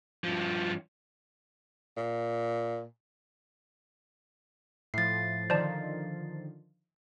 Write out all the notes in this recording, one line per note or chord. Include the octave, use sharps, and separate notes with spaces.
G2 F3
A#2
A2 F3 A6 C7
D3 D#3 F3 C5 D5 A5